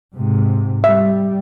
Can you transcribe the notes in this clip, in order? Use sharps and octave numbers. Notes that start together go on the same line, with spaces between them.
G#2 C3
G3 E5